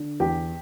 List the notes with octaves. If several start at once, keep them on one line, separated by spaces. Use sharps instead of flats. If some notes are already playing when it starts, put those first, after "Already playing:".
Already playing: D3
E2 G4